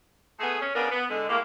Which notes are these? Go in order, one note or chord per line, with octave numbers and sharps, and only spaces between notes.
A3 B3 G#4
C#4
C#3 B3 D4 G#4 A#4
B3
D3 G#3
A2 G#3 A#3